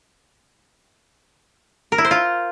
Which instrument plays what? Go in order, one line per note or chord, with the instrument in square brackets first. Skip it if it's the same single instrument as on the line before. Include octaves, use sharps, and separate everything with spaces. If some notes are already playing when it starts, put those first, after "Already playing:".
[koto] A#4
E4
C5
F4